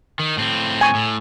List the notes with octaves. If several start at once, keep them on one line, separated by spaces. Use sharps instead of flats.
D#3
A2 C4
G#5 C#6
A2